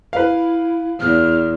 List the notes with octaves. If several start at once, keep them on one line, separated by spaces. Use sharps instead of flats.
E4 B4 F5
E2 F6